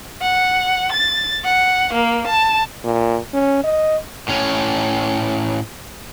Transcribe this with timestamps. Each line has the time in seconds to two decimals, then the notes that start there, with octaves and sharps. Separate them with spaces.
0.22 F#5
0.93 A6
1.45 F#5
1.94 A#3
2.27 A5
2.84 A#2
3.34 C#4
3.64 D#5
4.28 A2 C#4